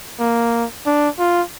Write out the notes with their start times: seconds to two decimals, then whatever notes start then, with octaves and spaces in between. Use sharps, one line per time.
0.20 A#3
0.86 D4
1.19 F4